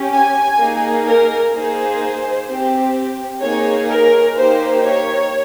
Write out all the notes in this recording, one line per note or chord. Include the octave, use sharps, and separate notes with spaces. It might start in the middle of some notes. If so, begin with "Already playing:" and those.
Already playing: C#4 G4
G#5
A#3 D#4 G#4
A#4
A#3 D#4 G#4 C5
C4 G4
A#3 D#4 G#4 C#5
A#4
A#3 D#4 G4 C5
C#5